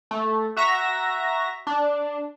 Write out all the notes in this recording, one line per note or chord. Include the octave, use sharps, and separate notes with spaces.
A3
F#4 E5 A#5 A#6
D4